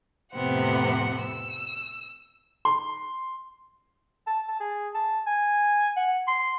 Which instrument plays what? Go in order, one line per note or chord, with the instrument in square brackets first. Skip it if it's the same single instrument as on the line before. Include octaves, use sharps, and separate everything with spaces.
[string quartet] F2 A2 C3 B3 C4 F#5
E6
[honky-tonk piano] C6
[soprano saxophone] A5
A5
G#4
A5
G#5
F#5
C6